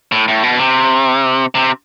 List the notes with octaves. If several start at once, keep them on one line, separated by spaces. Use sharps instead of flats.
A2
A2
B2
C3
C3